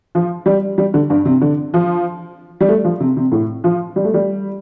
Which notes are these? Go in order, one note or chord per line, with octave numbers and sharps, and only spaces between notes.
F3
G3
G3
D3
G2
C3
D3
F3
G3
A3
F3
C3
C3
A2
F3
G3
A3
G3